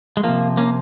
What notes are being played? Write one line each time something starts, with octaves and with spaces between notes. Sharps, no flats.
G#3
C3 F3 A#3
A#3 C#4